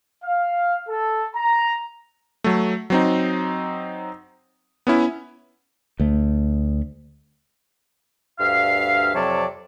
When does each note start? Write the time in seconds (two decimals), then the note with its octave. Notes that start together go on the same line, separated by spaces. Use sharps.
0.24 F5
0.89 A4
1.36 A#5
2.44 F#3 A3
2.90 F#3 C4 D#4
4.87 B3 C#4 E4
6.00 D2 A3
8.39 D2 G2 E5 F5
9.14 F2 C3 F#3 C#5 D5 A5